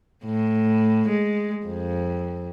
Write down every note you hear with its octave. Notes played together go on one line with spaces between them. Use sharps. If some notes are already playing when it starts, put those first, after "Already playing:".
A2
G#3
F2